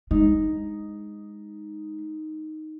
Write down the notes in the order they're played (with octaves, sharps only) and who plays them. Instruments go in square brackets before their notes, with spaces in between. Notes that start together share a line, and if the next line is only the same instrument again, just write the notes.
[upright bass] G#3 [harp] D#4